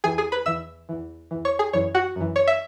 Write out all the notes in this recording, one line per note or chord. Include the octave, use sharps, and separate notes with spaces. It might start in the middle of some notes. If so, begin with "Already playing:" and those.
E2 E3 G#4 G#5
G#4 G#5
B4 B5
E2 E3 E5 E6
E2 E3
E2 E3
C#5 C#6
G#4 G#5
F#2 E3 C#5
F#4 F#5
F#2 E3
C#5
E5